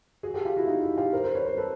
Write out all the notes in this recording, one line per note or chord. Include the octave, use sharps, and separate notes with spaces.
F#4 G#4
G4 A4
F4 G4
E4 F#4
D#4 F4
E4 F#4
F4 G4
A#4 C5
A#4 C5
B4 C#5
A#4 C5
A4 B4